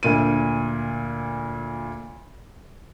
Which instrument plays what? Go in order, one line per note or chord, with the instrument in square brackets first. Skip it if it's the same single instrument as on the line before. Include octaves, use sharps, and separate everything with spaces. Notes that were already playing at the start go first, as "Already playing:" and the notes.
[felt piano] D2 A#2 D#7